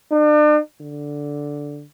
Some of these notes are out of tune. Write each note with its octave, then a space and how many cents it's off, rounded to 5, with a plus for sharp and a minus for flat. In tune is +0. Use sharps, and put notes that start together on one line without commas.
D4 +40
D3 -5